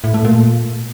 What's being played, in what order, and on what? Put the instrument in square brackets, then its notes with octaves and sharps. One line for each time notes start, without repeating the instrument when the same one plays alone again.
[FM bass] A2
A3
A#2